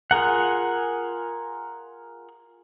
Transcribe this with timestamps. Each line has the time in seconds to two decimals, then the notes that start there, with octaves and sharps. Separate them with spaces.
0.11 F4 G#4 A#4 F#5